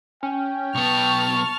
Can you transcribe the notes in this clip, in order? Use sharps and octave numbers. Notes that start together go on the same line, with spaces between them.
C#4 G5
B1 B3 A5 C#6 F6